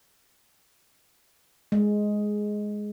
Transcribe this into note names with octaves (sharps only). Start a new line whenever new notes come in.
G#3